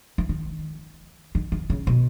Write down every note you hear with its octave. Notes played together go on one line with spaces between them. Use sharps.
E3
D#3
D#3
D#3
C#3
B2